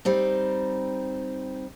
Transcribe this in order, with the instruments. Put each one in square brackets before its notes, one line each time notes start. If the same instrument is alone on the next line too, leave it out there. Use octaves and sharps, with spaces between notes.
[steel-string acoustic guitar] G3 C4 D#4